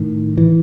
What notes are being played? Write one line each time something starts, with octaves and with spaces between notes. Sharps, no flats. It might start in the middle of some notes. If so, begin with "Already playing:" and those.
Already playing: A2 D#3
E3